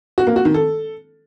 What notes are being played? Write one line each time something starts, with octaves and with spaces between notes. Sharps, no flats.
F#4
A#3
F#4
D#3
A4